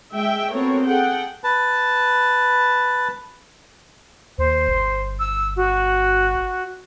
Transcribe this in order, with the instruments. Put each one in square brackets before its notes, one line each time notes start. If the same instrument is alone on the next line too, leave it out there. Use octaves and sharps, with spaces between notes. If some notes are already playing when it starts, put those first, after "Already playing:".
[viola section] G#3 E5 G5
B3 C4 F#4 A4 A#4 C#5
G#4 A4 F#5 G5
[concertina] B4 A5
[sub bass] D#2 [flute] C5
[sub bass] G1
[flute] E6
F#4